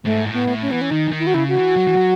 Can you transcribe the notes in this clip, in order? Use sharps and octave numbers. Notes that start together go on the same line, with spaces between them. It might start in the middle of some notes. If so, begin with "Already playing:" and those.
G#2 A3
A2
B3
A2
C#4
E3 B3
C#4
D#3 D#4
E3
D#3
E4
F#4
C#3 E4
F#4
E3
F#3
E3
F#3